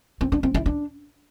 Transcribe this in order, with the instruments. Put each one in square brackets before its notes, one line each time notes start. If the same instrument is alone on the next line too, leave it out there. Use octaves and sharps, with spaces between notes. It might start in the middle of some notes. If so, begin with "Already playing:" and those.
[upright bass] C4
D4
C4
E4
D4